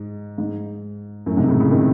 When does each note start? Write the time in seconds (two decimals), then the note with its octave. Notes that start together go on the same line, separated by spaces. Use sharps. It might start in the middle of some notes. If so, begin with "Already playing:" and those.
Already playing: G#2
0.38 G#2
1.26 F#2 A2
1.37 G#2 C3
1.48 A2 C#3
1.60 A2 C#3
1.71 C3 D#3